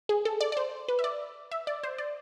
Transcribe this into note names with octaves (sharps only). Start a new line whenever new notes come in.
G#4
A4
D5
D5
C5
B4
E5
D5
E5
D5
C5
D5